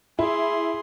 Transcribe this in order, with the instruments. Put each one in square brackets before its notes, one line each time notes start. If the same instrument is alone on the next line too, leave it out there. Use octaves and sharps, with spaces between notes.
[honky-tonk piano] E4 [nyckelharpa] G#4 C6